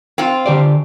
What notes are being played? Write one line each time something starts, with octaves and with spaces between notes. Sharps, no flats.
C4 F4
D3 G4 D5